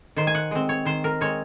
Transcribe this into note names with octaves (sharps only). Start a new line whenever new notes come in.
D#3 C5
G#5
F#5
G#3 C4
C#5
D#3 C5
A#4
G#3 C4 C#5